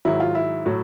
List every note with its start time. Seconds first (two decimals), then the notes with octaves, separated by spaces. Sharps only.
0.05 G#2 D#3 F#3 E4
0.20 F4
0.35 E4
0.66 A2 F#3